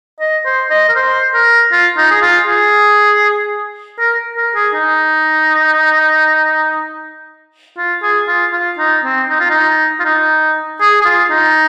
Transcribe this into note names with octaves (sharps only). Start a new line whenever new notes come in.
D#5
C5
D#5
A#4
C5
A#4
F4
D#4
G#4
F4
G#4
A#4
A#4
G#4
D#4
F4
G#4
F4
F4
D#4
C4
D#4
F4
D#4
F4
D#4
G#4
G#4
F4
D#4